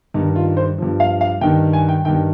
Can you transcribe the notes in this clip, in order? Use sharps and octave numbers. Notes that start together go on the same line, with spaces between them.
G2 D#3 D#4
F4
C5
G2 F3
F5
F5
G2 D#3 G5
G#5
G5
G2 D#3 G5